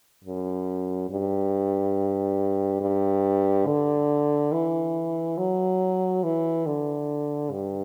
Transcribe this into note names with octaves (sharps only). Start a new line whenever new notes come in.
F#2
G2
G2
D3
E3
F#3
E3
D3
G2